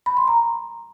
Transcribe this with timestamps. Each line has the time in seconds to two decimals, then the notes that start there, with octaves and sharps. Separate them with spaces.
0.06 B5
0.17 C6
0.28 A#5